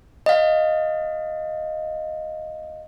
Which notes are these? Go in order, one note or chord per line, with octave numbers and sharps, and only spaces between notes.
D#5 F5